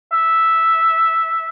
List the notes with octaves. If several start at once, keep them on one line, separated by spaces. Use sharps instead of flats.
E5